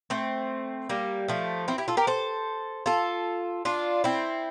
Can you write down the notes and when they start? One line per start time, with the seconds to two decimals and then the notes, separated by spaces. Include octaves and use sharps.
0.10 A3 C4
0.89 G3 A#3
1.28 F3 A3
1.68 C4 E4
1.78 E4 G4
1.88 F4 A4
1.97 G4 A#4
2.07 A4 C5
2.86 F4 A4
3.65 D4 F4
4.04 C4 E4